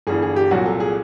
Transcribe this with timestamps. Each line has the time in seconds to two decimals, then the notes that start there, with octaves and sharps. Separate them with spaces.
0.07 G1 G2 E3 G#4
0.22 G#4
0.36 G4
0.51 C2 A#2 F#3 F#4
0.66 A4
0.80 G#4